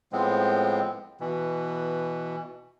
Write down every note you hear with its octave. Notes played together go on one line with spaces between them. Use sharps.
A2 F3 G#3 B3 C4
B2 E3